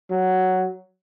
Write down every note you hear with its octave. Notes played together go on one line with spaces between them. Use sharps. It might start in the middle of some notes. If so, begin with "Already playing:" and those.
F#3